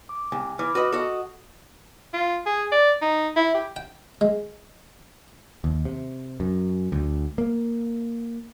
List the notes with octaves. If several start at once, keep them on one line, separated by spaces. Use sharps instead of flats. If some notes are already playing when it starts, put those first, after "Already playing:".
D6
C2 G#5
E3 B5 D6 F6
F#4 B4 D#5
F#4 A4 D#5 D#6
F4
G#4
D5
D#4
E4
G4
G5
G#3
D#2
C3
F#2
D2
A#3